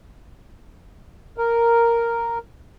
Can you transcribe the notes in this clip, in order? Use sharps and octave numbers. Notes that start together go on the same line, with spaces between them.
A#4